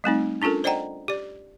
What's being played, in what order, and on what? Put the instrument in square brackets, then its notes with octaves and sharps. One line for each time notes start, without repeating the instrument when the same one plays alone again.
[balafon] G3 A3 C4 D#4
C#4 D4 F4 A4 A#4
C5 D5 D#5 F#5 G5 A#5
G4 D5